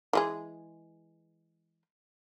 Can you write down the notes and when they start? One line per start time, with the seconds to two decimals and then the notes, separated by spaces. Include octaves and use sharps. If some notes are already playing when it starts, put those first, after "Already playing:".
0.13 E3 G#3 G#4